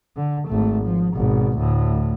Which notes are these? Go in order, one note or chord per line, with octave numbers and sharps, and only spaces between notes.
D3
G#1 A3
F3
G#1 B2
D2 A2